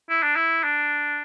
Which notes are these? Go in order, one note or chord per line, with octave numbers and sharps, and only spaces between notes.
E4
D4
E4
D4